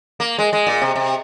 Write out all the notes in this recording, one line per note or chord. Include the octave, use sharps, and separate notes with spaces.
A#3
G#3
G#3
A#2
C3
C3